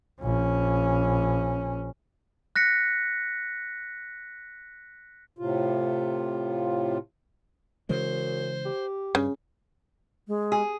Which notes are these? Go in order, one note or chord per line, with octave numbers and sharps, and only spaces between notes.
A#1 C#4
F#6 A#6 B6 C#7
A2 C3 F4
F#2 C#3 E3 G#3 C5
G4
G2 C#3
G#3
G#4